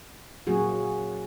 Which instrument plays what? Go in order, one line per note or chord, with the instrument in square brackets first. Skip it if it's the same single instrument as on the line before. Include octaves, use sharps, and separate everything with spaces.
[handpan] A#2 F#3 A#3 C#4 F#4 G#4